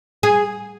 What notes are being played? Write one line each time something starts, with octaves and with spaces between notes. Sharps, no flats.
G#4